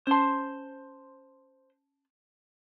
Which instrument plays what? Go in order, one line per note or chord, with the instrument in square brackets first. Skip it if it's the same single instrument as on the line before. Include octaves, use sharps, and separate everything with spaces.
[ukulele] C#4 A5 [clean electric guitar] C5 C6